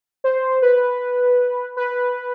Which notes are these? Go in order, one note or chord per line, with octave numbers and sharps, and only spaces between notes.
C5
B4
B4